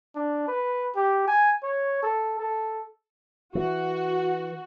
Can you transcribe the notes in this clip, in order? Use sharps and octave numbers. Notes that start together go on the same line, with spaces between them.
D4
B4
G4
G#5
C#5
A4
A4
E3 F#4